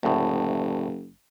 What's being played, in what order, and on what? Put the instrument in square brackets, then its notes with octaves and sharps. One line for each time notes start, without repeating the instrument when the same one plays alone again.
[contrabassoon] F#1 [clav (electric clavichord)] D2 A2